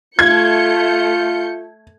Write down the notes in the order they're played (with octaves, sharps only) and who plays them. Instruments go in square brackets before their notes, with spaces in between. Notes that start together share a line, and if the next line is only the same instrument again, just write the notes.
[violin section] A3 G6 C#7 [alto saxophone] F4 [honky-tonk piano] G#6